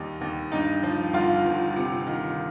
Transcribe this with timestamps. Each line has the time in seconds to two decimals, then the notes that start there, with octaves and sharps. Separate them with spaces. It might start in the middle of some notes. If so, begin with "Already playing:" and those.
Already playing: D#2 D#3 G3 D#4
0.21 D#2
0.52 G2 D#4
0.83 F3
1.13 G1 F4
1.45 G1
1.76 C3
2.07 D#3